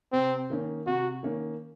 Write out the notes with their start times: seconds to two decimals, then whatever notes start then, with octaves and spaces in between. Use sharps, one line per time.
0.12 C3 C4
0.50 D#3 A#3 C#4
0.86 C3 F#4
1.23 D#3 A#3 C#4